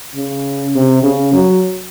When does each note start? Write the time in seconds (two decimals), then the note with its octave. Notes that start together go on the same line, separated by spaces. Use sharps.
0.16 C#3
0.75 C3
1.03 C#3
1.33 F#3